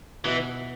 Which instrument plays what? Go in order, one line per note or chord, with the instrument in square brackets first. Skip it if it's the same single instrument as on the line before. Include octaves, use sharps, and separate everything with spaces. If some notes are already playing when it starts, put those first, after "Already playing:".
[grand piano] B2 [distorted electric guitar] E3